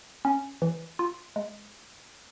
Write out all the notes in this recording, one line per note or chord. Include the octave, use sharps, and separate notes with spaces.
C#4
E3
F4
G#3